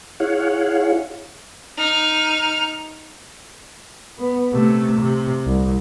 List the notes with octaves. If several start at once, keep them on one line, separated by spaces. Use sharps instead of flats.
E4 G#4 C#5 F5 F#5
D#4 F6
B3
C3 A3
C3
C2